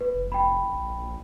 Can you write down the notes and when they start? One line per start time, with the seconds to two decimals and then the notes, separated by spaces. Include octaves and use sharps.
0.01 B4
0.14 F1
0.32 G5 B5
0.73 A#1